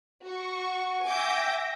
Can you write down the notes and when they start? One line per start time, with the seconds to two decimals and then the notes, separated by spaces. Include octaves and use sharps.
0.24 F#4 C#6
0.56 F#5
1.05 E5 G5 G#5 D6 G6 A#6